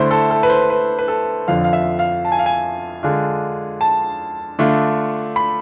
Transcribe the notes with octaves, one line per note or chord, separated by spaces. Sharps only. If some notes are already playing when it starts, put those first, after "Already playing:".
Already playing: D3 A3 E4 C5
A4
A4
B4
C5
B4
B4
A4
F2 D3 F3 F5
F5
E5
F5
A5
G#5
F5
G#5
D3 G#3 D4 F4
A5
D3 A3 D4 F4
B5